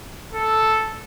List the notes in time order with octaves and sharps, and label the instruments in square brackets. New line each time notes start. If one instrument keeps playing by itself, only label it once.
[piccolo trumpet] A4